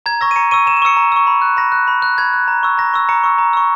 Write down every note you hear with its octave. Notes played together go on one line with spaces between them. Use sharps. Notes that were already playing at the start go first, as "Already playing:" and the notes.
A#5 G#6
C#6 E6 A#6
D#7
A#5 C#7
C#6 E6 D#7
A#5 E7
E7
C#6 E6 C#7
A#5
C#6 E6
B5
F#6
B5 A#6
F#6
B5
F#6
B5 G#6
F#6
A#5
C#6 E6
A#5 A#6
C#6 E6
A#5 C#7
C#6 E6
A#5
C#6 E6